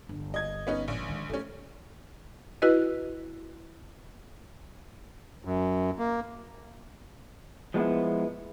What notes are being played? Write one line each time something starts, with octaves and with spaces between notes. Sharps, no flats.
G1
D#5 G#6
B3 C#4 D#4
A#1
D#3 G#3
E3 F#3 A3 C#4
E4 F#4 B4 D#5
F#2
A#3
F3 G#3 B3 E4